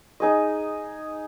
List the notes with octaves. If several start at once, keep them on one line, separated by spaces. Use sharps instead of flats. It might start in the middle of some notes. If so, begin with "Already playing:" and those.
D#4 G#4 D#5